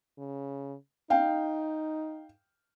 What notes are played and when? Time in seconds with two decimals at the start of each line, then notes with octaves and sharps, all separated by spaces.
0.18 C#3
1.10 D#4 F5 G5